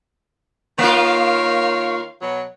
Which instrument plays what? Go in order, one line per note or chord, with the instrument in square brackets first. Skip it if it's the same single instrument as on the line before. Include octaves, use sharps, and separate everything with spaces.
[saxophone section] D#3 C#5 F5 [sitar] A#3 F4
[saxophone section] B2 F#3